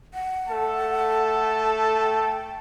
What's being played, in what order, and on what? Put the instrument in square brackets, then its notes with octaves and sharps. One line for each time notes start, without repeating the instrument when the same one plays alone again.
[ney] F#5
[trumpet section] A3 A4 A5
[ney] G5